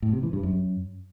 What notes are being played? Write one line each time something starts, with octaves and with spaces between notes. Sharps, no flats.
A2
C3
E3
G2
F#2